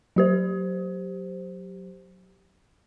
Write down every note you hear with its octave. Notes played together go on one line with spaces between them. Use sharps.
F#3 G4 C5